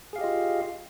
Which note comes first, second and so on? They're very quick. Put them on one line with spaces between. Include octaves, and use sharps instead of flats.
G#4 F5 G4 D#5 F4